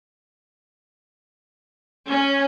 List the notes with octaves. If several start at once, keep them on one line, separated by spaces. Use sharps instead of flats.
C#4